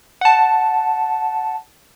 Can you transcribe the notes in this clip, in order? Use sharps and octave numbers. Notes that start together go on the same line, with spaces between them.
F#5 A5